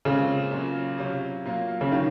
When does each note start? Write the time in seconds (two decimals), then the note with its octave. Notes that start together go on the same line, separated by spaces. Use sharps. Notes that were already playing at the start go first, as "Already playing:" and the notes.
0.05 A#2 C#3 G#3 C4
0.51 A#2 F#3 C#4
0.98 C3 F#3 C#4 F4
1.45 A#2 F#3 A#3 F4
1.81 C#3
1.92 D#3 F#3 C#4 F4